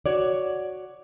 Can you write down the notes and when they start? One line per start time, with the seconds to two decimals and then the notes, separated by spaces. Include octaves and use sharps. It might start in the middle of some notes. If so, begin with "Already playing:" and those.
0.06 F#4 C#5 D5